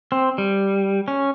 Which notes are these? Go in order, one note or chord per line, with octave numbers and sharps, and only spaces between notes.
C4
G3
C#4